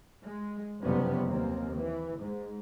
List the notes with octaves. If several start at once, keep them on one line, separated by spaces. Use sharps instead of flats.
G#3
F#1 F2 C3 G3 B3 C#4
D#2 A#3 C4
E3
G#2